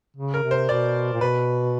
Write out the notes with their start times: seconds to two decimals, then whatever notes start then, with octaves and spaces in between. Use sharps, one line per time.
0.16 C#3
0.34 A#4
0.43 C3
0.51 C5
0.69 B2 D5
1.13 A#2
1.21 B2 B4